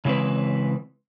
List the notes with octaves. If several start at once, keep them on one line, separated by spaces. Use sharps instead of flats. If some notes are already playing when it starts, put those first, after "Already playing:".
C#3 E3 G#3 C4 B4